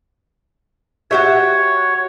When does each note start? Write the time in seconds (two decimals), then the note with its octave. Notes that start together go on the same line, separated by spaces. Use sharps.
1.11 F#4 G4 C#5 E5